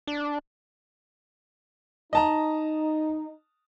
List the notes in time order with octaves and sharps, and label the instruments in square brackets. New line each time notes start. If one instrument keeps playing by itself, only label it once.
[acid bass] D4
[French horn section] D#4 [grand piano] D#5 A5 A#5